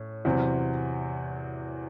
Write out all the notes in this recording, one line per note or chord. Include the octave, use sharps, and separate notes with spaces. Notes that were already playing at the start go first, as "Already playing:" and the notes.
Already playing: A2 C#4
E2 C3 F#3 C4 F#4